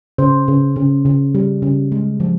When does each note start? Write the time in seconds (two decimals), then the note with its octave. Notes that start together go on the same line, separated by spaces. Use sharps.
0.18 C#3 C5
0.48 C#3
0.76 C#3
1.06 C#3
1.35 G3
1.62 C#3
1.92 G#3
2.20 F3